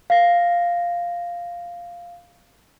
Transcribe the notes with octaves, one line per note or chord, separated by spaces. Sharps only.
F5 A#6